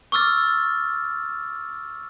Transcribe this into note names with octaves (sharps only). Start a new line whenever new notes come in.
C#6 D6 E6 F6 A6